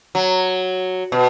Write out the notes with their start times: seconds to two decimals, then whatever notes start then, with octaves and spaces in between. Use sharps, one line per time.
0.15 F#3
1.12 B2